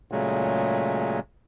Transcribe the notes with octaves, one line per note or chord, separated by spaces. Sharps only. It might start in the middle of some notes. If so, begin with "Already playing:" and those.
A#2 C#3 F#3 G#3 A3